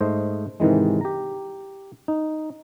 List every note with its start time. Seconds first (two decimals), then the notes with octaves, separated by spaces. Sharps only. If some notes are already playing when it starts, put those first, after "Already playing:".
0.01 G#2 A3 C5 D#5
0.60 G#2 C3 D#3 E3 G#3
1.01 G4 A#5
2.08 D#4